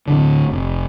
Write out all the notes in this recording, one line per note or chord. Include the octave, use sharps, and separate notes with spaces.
D1 D2 D3
F1